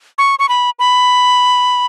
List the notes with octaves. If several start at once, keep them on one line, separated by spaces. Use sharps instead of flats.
C#6
C#6
B5
B5